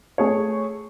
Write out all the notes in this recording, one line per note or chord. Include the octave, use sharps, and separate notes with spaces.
A3 G#4 C#5